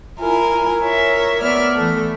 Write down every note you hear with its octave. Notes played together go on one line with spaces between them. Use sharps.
E4 F4 A#4 G#5
A#4 C#5 E5
B3 D5 E5 F6
E3 A3